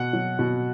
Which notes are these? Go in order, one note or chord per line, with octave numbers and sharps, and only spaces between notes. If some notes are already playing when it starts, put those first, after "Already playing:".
Already playing: B2 F#5
F#3
B2